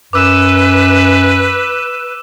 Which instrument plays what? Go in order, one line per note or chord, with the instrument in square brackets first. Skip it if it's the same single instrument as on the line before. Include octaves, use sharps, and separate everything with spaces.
[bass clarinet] F#2 [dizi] B4 [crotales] D6 E6 E7